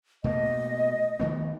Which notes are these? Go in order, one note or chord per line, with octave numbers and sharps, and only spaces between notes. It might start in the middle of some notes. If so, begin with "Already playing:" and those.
B2 A3 A#3 D#5
D#3 A3 B3